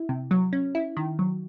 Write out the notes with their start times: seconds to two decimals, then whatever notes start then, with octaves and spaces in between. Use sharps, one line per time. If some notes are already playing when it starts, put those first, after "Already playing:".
Already playing: E4
0.09 C3
0.31 F#3
0.53 C#4
0.75 E4
0.97 D#3
1.19 F#3